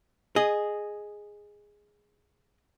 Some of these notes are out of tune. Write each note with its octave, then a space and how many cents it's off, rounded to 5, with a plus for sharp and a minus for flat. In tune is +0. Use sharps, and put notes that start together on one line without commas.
G#4 +0 D#5 -10